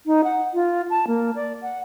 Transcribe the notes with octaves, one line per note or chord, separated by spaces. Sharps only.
D#4
F#5
F4
A5
A#3
D5
F#5